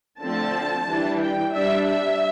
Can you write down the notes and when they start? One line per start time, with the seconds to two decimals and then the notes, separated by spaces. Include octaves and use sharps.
0.20 D3 F3 A3 C4 A5
0.87 E3 G3 D4
1.20 G5
1.53 G3 D4 E5
1.87 E5